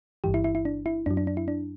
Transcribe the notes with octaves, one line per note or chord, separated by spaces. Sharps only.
G1 G2 E3 G4
E4
E4
E4
D4
E4
F#2 F#3 D4
D4
D4
E4
D4